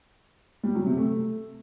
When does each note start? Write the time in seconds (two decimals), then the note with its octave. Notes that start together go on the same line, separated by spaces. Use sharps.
0.63 G3
0.75 F#3
0.86 C3
0.97 A3